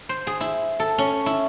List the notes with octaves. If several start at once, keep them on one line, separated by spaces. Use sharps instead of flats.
C5
G#4
E4
A4
C#4
E4